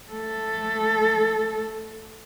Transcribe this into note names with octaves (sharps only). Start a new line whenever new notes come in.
A3 A4